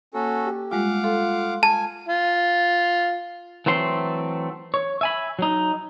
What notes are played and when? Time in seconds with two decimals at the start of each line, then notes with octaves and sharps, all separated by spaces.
0.14 A#3 C#4 F#4 A4
0.45 G4
0.72 G3 G#3 F4 F5 F#5 D6
1.04 F4 A4
1.63 G#5 A5
2.08 F4
3.66 E3 F#3 A3 C4 C6
4.74 C#5
5.01 E5 G#5 B5
5.39 F#3 D#4